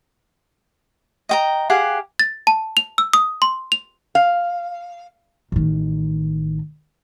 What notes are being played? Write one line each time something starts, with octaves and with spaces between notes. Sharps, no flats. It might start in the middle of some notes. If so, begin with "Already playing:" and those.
D#5 G5 A#5
G4 G#4 F5 F#5
A6
A5
F7
E6
D#6
C6
F7
F5
A1 D#3